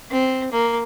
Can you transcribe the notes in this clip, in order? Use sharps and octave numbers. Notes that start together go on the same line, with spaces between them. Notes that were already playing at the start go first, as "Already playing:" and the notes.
C4
A#3